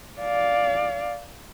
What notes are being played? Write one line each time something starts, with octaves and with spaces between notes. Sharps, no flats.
D5 F5